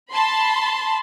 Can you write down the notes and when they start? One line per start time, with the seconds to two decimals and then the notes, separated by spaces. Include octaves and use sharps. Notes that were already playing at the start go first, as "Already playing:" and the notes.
0.12 A5 B5 C6